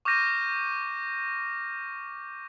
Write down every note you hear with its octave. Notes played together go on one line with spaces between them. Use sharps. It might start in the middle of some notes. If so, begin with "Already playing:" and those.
C#6 D6 F6 G6 A#6 D#7